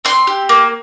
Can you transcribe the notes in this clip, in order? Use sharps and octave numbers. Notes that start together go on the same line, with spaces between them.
C4 C6
G4
A#3